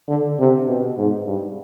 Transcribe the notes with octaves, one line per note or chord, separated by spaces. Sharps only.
D3
C3
B2
G#2
G2